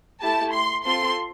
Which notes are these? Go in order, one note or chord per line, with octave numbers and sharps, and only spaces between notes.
A3 E4 G4 A5
C6
C4 F4 A4 C6